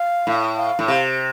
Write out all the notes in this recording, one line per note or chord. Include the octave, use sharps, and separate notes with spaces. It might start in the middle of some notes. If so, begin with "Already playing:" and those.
Already playing: F5
A2
F5
A2
C3 F5